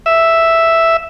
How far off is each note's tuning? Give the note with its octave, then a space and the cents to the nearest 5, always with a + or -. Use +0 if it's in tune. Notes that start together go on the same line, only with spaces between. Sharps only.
E5 +0